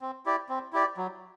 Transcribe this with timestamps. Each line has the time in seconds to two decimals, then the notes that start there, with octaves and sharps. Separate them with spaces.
0.01 C4
0.26 E4 G4 D5
0.49 C4
0.73 E4 G4 D5
0.97 F#3